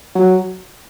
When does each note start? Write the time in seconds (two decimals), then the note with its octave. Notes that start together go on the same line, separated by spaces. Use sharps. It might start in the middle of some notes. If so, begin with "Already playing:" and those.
0.15 F#3